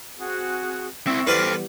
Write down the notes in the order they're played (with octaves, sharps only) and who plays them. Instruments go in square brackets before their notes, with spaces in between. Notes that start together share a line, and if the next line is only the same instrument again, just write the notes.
[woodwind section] C4 F#4 G#4
[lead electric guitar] C4 E4 [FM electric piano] E5 C#6 E6
[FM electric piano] E3 G3 B3 [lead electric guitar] A4 C5 [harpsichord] B4 D5 [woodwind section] F6